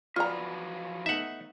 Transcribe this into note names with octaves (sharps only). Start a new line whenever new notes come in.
F3 F#3 F4 B4 D5 A#5
A3 B3 D#4 E5 F#5